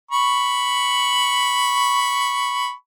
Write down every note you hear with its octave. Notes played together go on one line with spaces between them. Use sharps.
B5 C#6